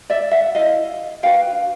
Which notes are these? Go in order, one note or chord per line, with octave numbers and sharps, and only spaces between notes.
D5 E5
E5 F#5
E4 A4 D#5 F5
D4 F#4 B4 F5 G5